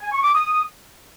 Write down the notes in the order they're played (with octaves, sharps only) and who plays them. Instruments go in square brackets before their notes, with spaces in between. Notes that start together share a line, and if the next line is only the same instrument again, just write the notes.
[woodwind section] G#5
C#6
D6
D#6